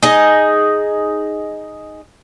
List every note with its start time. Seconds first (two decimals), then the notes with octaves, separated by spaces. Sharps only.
0.03 D#4 G#4 D#5